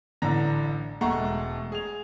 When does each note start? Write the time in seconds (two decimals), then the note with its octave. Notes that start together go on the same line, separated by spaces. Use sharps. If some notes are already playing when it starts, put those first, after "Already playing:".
0.22 A1 A2 D3 D4 A#5 A#6
1.01 E1 G#3 A3 F#5 A#5 C#6
1.72 G#4 F7